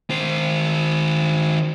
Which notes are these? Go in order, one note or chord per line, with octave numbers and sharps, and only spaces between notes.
D#3 C5